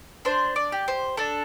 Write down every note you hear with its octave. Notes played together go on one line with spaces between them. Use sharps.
D4 C5
D5
G4
C5
D4 A4